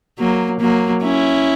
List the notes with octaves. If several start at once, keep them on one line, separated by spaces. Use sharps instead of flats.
F#3 A#3
F#3 A#3
C#4 E4